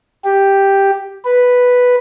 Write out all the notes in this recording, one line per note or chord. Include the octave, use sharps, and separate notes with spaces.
G4
B4